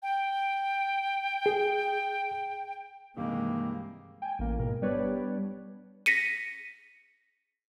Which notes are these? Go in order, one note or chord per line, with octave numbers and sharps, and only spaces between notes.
G5
G#4
G2 C3 D#3 E3 G#3 A#3
G5 G#5
A1 A#3
G#2 B2 A#4
G3 B3 D4 B4 C#5 D5
A#6 B6 C#7 D#7